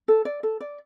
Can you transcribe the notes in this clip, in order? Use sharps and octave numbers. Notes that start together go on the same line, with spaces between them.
A4
D5
A4
D5